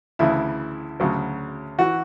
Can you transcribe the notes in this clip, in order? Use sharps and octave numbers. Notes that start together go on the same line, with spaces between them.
D2 C#3 E3 E4
D2 C#3 F#3
E3 F#4